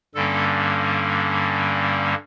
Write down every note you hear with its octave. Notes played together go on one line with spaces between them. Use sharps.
G2 D3 G3 A#3 C#4 A4